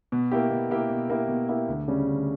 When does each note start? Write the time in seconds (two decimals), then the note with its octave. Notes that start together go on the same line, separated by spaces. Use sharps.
0.12 B2
0.32 A#3 E4 G4
0.51 B2
0.71 A#3 E4 G4
0.90 B2
1.10 A#3 E4 G4
1.29 B2
1.49 A#3 E4 G4
1.68 D2
1.88 C#3 G3 C#4
2.07 D2